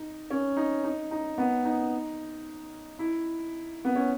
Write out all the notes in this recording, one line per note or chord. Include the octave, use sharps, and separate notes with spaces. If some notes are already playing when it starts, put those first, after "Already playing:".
Already playing: D#4
C#4
D#4
D#4
D#4
B3
D#4
E4
B3
C#4